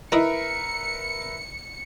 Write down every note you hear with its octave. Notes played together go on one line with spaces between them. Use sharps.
D#4 E4 A#4 B4 D#5 E5 C#7